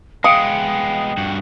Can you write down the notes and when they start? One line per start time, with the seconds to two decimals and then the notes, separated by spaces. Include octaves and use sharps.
0.24 G#3 B3 F5 G5 D#6 C#7 D7
1.18 G2 F#4